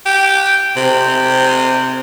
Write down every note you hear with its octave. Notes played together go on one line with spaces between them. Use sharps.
G4
C3